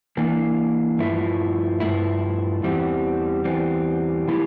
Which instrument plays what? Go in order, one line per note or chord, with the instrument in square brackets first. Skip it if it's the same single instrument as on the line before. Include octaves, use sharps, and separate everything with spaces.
[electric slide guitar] E3 A#3 D4
G2 F3 A3 E4
G2 F3 A3 E4
E2 E3 G3 C4
E2 E3 G3 C4
A2 F3 A#3 E4 G4